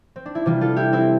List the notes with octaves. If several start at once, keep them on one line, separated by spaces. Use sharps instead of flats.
C4
D4
E4
C3 E3 G3 D4 F4
F4 A4
E4 G4
C4 E4